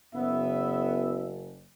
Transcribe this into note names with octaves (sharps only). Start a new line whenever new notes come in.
F#1 B3 E5